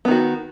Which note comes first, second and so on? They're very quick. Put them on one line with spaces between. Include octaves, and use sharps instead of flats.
B3 D#3 F#4